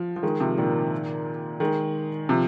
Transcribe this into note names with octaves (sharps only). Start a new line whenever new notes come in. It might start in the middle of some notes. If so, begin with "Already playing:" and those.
Already playing: F3
F3
D#3 G#3
C3 F3
A#2 D#3
D#3 G#3
C3 F3